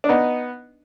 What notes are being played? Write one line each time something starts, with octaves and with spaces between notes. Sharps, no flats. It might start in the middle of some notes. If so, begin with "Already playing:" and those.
D4
B3 D#4